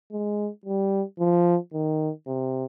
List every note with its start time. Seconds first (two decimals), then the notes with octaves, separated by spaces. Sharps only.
0.12 G#3
0.65 G3
1.19 F3
1.73 D#3
2.27 C3